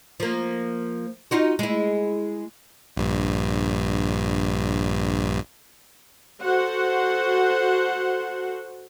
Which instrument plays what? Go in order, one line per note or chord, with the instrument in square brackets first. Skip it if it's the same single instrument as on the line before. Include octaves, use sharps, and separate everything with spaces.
[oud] F3 A#3
D#4 F4 F#4
G#3 E4
[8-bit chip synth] A#1 G2
[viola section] F#4 A4 C5 F#5